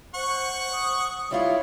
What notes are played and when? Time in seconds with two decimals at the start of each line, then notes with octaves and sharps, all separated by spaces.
0.15 C5 F#5 C#6
0.73 D#6
1.31 G3 E4 F4 C#5